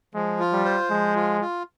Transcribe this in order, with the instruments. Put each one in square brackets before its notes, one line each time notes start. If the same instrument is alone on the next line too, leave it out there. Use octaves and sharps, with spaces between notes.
[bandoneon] F3 [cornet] G#3
[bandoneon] F4
[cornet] G3
[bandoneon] C5
[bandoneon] F3 [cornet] G#3
[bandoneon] F4
F4